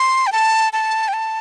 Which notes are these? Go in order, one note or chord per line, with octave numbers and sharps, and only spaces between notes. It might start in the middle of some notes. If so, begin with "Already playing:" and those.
Already playing: C6
G5
A5
A5
G5
A5